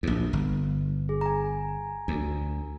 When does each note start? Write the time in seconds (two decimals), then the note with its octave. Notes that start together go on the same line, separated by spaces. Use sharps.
0.03 A#1 D#2
0.33 G1
1.09 G#4
1.21 G#5 A#5
2.08 D2